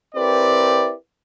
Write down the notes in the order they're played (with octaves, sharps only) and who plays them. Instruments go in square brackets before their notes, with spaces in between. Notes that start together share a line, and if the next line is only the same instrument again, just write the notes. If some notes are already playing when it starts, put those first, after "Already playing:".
[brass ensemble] C4 E4 G4 A#4 B4 D5